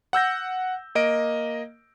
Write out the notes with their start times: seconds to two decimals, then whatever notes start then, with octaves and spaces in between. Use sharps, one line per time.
0.13 F#5 E6 G6 A#6
0.95 A#3 D#5 D7